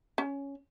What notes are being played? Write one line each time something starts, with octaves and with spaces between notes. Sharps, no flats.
C#4